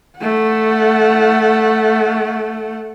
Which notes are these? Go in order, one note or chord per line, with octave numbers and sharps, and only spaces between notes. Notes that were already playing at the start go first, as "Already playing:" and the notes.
A3 F#5